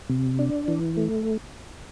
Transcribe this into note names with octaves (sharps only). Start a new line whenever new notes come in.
C3
D4
E3
A3